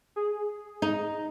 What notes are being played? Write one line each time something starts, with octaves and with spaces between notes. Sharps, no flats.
G#4
D#4